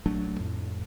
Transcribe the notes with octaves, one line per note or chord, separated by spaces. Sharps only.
A#1 F#3 A3 D4
F2 A2